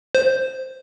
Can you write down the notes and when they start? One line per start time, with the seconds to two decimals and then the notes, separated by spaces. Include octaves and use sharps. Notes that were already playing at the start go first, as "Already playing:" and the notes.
0.15 C5